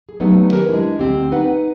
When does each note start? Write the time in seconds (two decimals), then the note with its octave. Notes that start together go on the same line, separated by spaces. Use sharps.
0.09 G#4
0.20 F#3 G3 A3 B3 D#4
0.51 D#3 C#4 G4 A#4 B4
0.69 G#3 D4 E4
0.99 D2 B2 C4 G4
1.32 D#4 B4 F#5